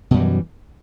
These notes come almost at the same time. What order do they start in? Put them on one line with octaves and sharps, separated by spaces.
B2 F#2 G3 E3